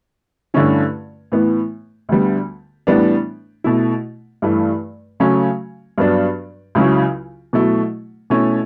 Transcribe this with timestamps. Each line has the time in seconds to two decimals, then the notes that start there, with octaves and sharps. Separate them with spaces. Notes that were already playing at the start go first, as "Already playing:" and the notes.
0.54 G2 D3 A3 C#4 E4
1.32 A2 E3 B3
2.09 D2 D3 G3 B3
2.87 A2 E3 G3 B3 D4
3.64 B2 A3 E4
4.42 G2 E3 A3
5.20 C#3 F#3 A3 C#4
5.98 G2 F#3 B3 D4
6.75 C#2 C#3 F#3 C#4 E4
7.53 B2 F#3 A3 E4
8.30 B2 A3 C#4 E4